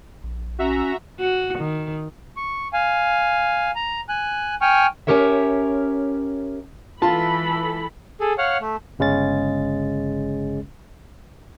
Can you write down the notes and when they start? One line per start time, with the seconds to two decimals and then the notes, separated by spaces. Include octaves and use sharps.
0.23 A#1
0.59 C#4 F#4 E5 A#5
1.19 F#4
1.59 D#3
2.37 C#6
2.73 F5 G#5
3.75 A#5
4.09 G#5 F#6
4.61 G5 G#5 C#6 F6
5.07 C#4 D4 G4 A#4 C#5 E5
7.02 E3 F4 A4 A5 B5
8.21 G#4 A4
8.38 C#5 F5 F#5
8.61 A3
8.99 G1 C#3 G#3 C#4 A6